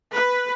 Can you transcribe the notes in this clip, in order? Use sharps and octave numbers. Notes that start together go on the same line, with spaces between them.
B4